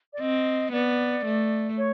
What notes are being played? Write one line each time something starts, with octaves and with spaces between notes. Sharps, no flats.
D5
C4 D#5
B3 D5
A3
C#5